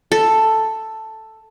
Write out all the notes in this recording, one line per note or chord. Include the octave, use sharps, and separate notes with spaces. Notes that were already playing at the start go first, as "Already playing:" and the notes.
A4